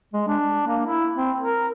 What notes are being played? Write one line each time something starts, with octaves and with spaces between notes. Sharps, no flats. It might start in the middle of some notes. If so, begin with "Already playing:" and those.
G#3
D4
A#3
E4
C4
A#4